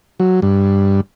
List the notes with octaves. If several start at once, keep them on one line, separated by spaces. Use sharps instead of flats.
F#3
G2